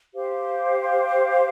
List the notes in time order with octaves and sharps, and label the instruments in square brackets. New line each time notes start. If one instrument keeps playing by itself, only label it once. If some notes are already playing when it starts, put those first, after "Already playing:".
[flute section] G4 C5 F5